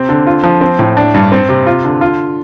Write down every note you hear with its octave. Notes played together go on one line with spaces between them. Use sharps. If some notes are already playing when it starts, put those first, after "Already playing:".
Already playing: C3 C4
D3
F4
F3
C4
A2
D4
G2
C4
C3
F4
D3
F4